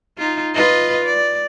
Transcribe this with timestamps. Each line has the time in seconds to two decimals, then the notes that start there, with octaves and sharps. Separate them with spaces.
0.18 D#4 F4
0.55 F4 B4 D#5
1.05 D5